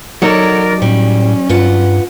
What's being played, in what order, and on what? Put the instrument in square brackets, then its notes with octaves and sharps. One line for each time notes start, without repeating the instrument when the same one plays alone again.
[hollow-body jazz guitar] F#3 D#4 [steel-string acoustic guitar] A4 C#5 F#5 [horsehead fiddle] A#4 D5
[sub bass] A2 [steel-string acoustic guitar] G3 [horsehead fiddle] C#4
[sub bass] G2 [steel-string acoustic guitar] F4 B4 F#5